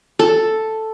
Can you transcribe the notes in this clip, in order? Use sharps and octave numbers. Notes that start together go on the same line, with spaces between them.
A4